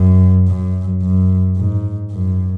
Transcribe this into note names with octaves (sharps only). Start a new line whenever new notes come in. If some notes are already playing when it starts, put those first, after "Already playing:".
Already playing: F#2
F#2
F#2
G#2
F#2